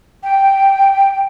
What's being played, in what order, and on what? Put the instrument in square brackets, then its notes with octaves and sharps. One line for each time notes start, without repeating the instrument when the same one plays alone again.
[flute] G5